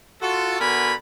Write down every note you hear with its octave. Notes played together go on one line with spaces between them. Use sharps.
F4 F#4 A4
D3 B3 F#4 A#4 G#5 B5